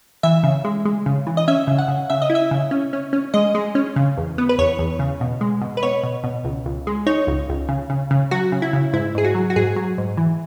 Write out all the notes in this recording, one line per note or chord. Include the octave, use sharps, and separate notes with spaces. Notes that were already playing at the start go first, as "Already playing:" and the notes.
E3 E5
C#3
G#3
G#3
C#3
E3
D#5
C#4 E5
C#3
F#5
C#3
C#3 E5
D#5
E4
E5
C#3
C#4
C#4
C#4
G#3 D#5
G#3
C#4
C#3
E2
B3
B4
E2 C#5
E2
C#3
B2
G#3
B2
B4
B2 C#5
B2
B2
C#2
C#2
G#3
D#4 C#5
C#2
C#2
C#3
C#3
C#3
F#3 F#4
C#3
E4
C#3
G#2 E4
G#2 G#4
F#4
F#3
F#4
G#2 G#4
F#3
G#2
E3